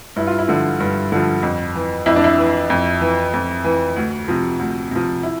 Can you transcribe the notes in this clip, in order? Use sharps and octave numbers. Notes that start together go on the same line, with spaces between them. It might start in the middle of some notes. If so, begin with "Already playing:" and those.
G2 E4
F4
E4
D3 F3
G2
D3 F3
F2
E3
F2 E4
D4
E4
E3
F2
E3
F2
E3
D2
C3 F3
D2
C3 F3
E4